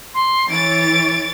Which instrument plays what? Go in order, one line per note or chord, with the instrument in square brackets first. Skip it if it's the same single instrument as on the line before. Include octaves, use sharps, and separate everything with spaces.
[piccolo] C6
[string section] E3 C#5 A6 [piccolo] D7